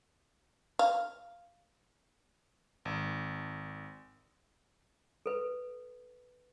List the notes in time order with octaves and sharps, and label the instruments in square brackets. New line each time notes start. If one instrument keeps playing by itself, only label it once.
[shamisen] F5
[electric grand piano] G#1
[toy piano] A4 B4